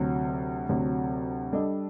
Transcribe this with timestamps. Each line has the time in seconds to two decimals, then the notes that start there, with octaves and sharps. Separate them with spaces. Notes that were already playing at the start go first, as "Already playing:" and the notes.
Already playing: D2 C3 F#3
0.69 D2 C3 F#3
1.53 G3 D4 A4 D#5